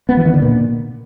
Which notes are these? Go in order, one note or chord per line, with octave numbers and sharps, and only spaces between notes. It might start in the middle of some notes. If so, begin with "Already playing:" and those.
B3
E3
D#3
D3
A#2